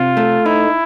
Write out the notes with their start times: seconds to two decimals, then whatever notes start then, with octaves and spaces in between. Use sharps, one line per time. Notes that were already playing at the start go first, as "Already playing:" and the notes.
Already playing: C3 F4
0.17 A3
0.46 D#4 E4